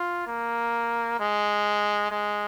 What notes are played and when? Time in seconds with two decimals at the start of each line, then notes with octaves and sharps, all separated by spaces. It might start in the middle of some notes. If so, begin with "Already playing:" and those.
Already playing: F4
0.27 A#3
1.19 G#3
2.11 G#3